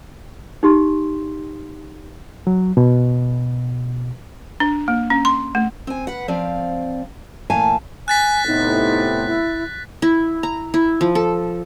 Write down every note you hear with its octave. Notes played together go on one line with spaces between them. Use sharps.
D#4 G4 C6
F#3
B2
D4
A#3
C#4
C6
A3
C4 G#5
B4 F#5
F3 C4 D5 F5
A#2 E3 A3 F5 G#5 A5
G#5 F#6 A6 B6
A2 C3 B3 D#4
E4
E4
A#5
E4
F3
A4